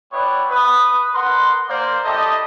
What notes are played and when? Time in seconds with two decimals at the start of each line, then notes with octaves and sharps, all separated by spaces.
0.12 G3 B3 E4 B4 C#5 D5
0.50 B4 D#6
1.14 A#4 B4 F#5 C6
1.69 A#3 C5 D5
2.05 A3 E4 G4 A4 D#5